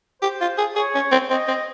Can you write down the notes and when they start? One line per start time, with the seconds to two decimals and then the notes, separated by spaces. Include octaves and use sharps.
0.22 G4 C5
0.41 F4
0.58 G#4
0.76 G#4 C#5
0.95 C#4
1.12 C4
1.30 C4 D#5
1.48 C4